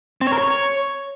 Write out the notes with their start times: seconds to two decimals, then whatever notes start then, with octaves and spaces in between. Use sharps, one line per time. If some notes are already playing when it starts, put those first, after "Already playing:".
0.21 C4
0.27 C#5
0.33 A#4
0.38 C#5